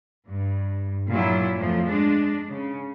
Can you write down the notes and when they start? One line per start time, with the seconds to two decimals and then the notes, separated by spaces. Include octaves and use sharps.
0.27 G2
1.10 A#2 F#3 E4
1.59 F2 A2 F3
1.87 G#3 D4
2.50 C#3